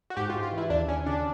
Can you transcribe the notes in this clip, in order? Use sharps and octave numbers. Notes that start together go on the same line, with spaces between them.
F#4
G#2 G4
F4
G#2
F4
E3
E4
D#2 D4
D#2 C#4
C#3 D4